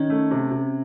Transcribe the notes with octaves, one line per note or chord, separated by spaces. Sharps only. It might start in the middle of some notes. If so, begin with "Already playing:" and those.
Already playing: D#3 C#4
A3
C3
C3